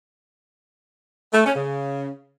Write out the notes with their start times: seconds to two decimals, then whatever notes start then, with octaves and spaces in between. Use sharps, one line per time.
1.34 A3
1.45 C#4
1.56 C#3